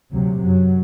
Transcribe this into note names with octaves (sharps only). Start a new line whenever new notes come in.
D2 C3 F#3
F#2 F#3